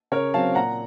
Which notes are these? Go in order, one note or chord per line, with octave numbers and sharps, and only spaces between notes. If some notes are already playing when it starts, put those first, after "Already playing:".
C#3 A#4 C#5
F#3 C4 F5 A5
A#2 F#5 A#5